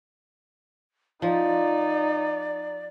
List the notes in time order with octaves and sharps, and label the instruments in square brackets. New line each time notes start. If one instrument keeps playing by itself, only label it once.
[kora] F3 [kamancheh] D#4 [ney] D5